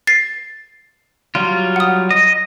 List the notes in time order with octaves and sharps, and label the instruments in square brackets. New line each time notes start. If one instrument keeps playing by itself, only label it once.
[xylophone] A6 C7
[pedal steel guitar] F#3 G3 F4
[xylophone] F#5 D#6
[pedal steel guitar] D#5